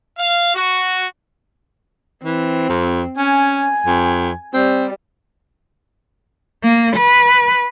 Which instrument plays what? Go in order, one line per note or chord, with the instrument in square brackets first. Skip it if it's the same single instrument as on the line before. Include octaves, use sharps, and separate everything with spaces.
[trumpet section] F5
F#4
[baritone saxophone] E3 [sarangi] C4
[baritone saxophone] F2
[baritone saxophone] C#4 [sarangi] G#5
[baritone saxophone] F2
[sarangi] G3 [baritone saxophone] C4
[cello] A#3
B4